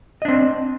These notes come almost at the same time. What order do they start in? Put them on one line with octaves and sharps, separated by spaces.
D#5 D4 C4